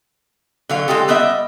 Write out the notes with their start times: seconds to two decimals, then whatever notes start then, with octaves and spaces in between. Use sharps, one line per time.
0.69 D3 F#3 F5
0.88 G#3 C4 F4 G4 A4
1.08 G3 B3 G4 D#5 E5